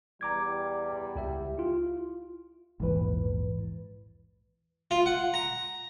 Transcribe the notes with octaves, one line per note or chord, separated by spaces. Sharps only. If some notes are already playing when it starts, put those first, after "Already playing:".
E2 G3 A#5 D6 G#6
C#2 G4 E5
E4 F4
A#1 E2 G#2 E3 B4
F4
F#5
A#5